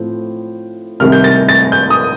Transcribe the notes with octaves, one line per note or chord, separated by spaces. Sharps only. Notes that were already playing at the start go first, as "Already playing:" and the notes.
Already playing: A2 F3 C4
C2 C3 D#3 G3 F6
G6
A6
A6
G6
D#6